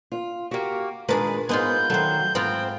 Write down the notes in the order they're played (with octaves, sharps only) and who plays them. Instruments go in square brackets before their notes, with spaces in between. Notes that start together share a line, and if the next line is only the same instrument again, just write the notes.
[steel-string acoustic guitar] F4
[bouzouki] A#3 F#4 [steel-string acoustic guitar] G4
[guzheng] A#2 D4 G#4 [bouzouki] D#3 [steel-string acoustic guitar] G#3 B4
[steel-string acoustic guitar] G#2 B3 [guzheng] G#3 D#4 F4 [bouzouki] B4 [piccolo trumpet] G6
[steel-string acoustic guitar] D#3 F#3 [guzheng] A3 C5
[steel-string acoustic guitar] G#2 [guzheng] B3 F4 A#5 [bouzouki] C4 [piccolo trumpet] G5